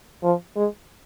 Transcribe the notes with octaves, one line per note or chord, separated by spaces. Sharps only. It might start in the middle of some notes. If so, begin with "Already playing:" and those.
F3
G#3